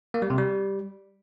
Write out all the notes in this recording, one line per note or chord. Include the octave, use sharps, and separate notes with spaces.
A#3
G3
C3
G3